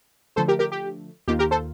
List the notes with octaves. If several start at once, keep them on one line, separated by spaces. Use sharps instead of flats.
D3 F3 A3 A4 C5
G4 A#4
G4 A#4
G4
D#2 D#3 A#3 F4 G4
G4 A#4
A4 C5